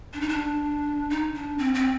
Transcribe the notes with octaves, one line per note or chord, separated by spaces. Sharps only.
D4
D#4
D4
D#4
D4
C4
C4